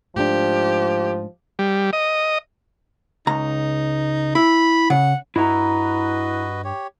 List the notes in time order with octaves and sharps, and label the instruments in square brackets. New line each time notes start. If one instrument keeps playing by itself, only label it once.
[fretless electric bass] G#2 A3 D4 [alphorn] F3 [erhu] G4
[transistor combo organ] G3
D#5
[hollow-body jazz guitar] C#2 A#5 [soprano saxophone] D#4
[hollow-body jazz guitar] E4 [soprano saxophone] B5
[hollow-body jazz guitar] C#3 [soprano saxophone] F#5
[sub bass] G2 [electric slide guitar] E4 A#5 [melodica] F#4 B4 D#5
[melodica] G4 C#5